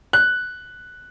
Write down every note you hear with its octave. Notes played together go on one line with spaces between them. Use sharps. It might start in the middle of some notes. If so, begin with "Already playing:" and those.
F#6